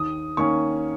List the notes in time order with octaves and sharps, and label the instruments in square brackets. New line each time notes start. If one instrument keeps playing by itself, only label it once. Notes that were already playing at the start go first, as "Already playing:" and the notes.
Already playing: [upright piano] D#2 D#6
D#3 A#3 C#4 C#6